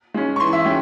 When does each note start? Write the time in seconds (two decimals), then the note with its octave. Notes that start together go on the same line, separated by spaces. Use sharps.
0.14 G#3 C#4
0.36 C#6
0.40 E3 C6
0.53 E5
0.65 G#3 C#4 G5